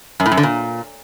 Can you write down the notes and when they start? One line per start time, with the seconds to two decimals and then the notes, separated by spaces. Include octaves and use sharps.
0.20 F#2
0.26 A2
0.31 F#2
0.37 D3
0.43 A#2